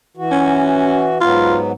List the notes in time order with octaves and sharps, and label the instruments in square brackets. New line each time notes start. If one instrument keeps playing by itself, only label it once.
[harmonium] E3 F#4
[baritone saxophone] C#4
[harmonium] G#2 F#3 B3 [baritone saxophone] F4